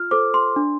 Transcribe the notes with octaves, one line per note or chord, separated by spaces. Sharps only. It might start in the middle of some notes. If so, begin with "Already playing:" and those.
Already playing: F4 F6
A4 C5 D6
C6
D4